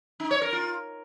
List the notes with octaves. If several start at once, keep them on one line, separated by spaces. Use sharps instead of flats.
D#4
C#5
A#4
F4